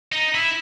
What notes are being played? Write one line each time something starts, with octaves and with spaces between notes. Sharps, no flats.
D#4
E4